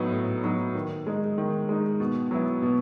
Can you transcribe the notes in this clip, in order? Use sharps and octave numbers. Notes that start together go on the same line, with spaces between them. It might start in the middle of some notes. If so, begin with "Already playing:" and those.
Already playing: A2 F#3 B3 D#4
A2
F#3 B3 D#4
D#3
G#3 D#4
D#3
G#3 D#4
B2
F#3 B3 E4
B2